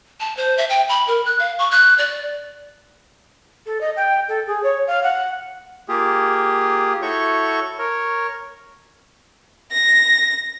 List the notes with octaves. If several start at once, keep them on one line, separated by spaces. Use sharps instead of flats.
A5
C5
E5
G5
B5
A#4
F#6
F5
C#6
F#6
D5
A4
D#5
G5
A4
G#4
C#5
F5
F#5
A#3 F4 G4 G#4
E4 F#4 A4 C#5 C#6 G6
A#4 C#5
A#6